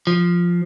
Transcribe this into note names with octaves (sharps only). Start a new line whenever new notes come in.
F3